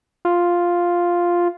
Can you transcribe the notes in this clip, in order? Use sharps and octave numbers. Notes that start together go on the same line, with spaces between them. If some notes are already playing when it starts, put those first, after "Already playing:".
F4